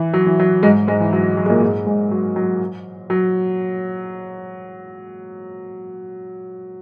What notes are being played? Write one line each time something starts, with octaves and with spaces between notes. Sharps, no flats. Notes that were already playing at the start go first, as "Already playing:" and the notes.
Already playing: E3
F#3
E3
F#3
G#2 G#3
G#2 G#3
E3
F#3
F#3
G#3
A#2 A#3
G#2 G#3
G#2 G#3
F#3
F#3
F#3